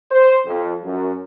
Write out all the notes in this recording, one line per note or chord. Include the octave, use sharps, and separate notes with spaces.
C5
F2
F#2